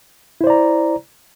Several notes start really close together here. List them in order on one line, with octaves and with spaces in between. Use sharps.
E4 C5 D5 A#5